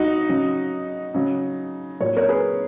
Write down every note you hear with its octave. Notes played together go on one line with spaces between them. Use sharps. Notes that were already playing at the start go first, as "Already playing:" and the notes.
Already playing: F#3 D#4 F#4
C#3 F#3
C#3 F#3
A#2 F#3 C#5
A#4 C#5
G#4 B4